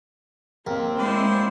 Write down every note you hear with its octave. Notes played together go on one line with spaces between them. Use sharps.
D#2 C4
G#3 E4 C5 D5